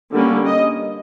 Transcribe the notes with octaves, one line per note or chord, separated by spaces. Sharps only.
D3 G3 A#3 C#4
D#5